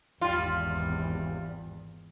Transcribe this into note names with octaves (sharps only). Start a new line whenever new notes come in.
G#1 E2 G3 F4